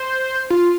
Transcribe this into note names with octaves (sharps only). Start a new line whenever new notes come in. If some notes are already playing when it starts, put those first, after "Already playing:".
Already playing: C5
F4